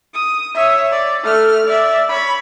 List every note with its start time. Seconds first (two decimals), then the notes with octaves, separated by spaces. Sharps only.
0.14 D#6
0.55 C#5 E5
0.92 D5
1.23 A3 F6
1.67 D5 E5
2.09 C#5 B5